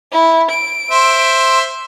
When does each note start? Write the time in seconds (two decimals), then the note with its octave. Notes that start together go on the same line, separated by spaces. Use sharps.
0.12 E4
0.51 D7
0.91 C5 E5